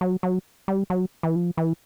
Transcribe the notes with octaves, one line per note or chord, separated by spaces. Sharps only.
F#3
F#3
G3
F#3
E3
F3
E3